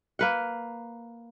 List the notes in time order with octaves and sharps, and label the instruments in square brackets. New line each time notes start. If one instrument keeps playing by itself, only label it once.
[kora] A#3 B4 F#5